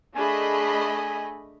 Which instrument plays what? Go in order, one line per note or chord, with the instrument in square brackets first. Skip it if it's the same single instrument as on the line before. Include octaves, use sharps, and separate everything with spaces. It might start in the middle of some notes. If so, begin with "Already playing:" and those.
[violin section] A3 D#5 B5 [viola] D4 G#4 [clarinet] G#5